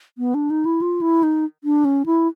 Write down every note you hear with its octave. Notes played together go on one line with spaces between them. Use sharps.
B3
D4
D#4
E4
F4
E4
D#4
D4
C#4
E4